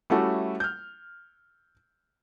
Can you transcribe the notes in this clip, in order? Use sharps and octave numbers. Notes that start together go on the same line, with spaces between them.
G3 A3 C#4 E4 F#4 A4
F6 G6